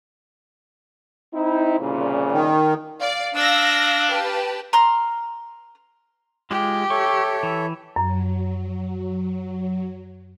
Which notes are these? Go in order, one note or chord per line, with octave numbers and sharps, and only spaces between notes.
C4 D#4 E4
C2 A#2 C#3
D#3
D5 F5
D4 E6 A#6
G4 B4 A5
A#5 C6 F6
G#3 F4 G4 D6
A4 C#5 E5 C#6
E3
F#2 F#3